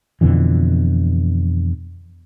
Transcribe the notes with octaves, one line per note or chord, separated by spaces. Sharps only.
F2 B2 D3 E3